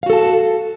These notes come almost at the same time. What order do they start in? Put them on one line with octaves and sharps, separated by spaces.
F5 F#4 A4 A5